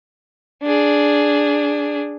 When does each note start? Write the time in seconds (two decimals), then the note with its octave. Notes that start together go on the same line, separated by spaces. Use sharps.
0.63 D4 G#4